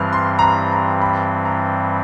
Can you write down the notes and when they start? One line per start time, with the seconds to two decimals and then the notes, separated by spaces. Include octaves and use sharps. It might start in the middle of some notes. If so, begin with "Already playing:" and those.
Already playing: G2 E3 G3 C4 F6 F#6
0.13 C6
0.39 A#5
0.42 B5
0.72 A#5
1.02 B5
1.45 A#5